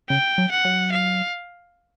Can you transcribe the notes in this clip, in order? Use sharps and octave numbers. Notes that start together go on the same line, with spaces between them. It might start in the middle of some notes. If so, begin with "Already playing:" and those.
C#3 G5
F#3
F#5
F#3
F5